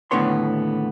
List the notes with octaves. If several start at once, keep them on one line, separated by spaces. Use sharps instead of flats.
D#2 A2 D3 B3 C#5 C6